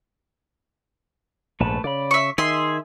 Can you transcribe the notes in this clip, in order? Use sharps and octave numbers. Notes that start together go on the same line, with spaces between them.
A#1 G#2 A3 B4 A5
C#3 D5 B5
E5 C#6
D#3 G#4 E5 C6